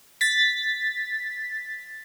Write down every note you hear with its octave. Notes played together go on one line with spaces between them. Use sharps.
A6 B6